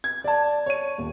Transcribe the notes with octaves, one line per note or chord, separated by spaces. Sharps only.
G#6
D5 A5
C#5 D#7
D#1